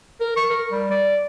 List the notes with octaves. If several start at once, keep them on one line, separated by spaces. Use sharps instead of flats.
A#4
C#6
A#4
G3
D5